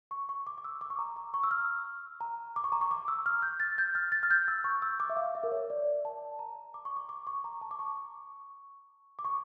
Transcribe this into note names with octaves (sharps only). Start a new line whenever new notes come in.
C#6
C#6
D6
D6
E6
D6
C#6
A#5
A#5
C#6
E6
F6
A#5
D6
C#6
A#5
C#6
D6
E6
F6
G6
A6
G6
F6
A6
F6
G6
E6
C#6
E6
D6
E5
F5
E5
A#4
C#5
D5
A5
A#5
D6
C#6
D6
D6
C#6
A#5
A5
D6
C#6
D6
C#6